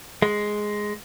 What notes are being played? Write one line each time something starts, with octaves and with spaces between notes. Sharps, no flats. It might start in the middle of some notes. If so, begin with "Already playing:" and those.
G#3